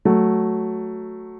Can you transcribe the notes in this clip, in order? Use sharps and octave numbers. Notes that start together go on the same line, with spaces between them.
F#3 A3